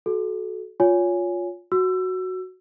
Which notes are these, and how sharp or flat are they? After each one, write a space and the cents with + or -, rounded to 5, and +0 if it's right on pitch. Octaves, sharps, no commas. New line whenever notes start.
F#4 +0 A4 -30
F4 +15 C#5 +25 G#5 +0
F#4 +0 E6 +25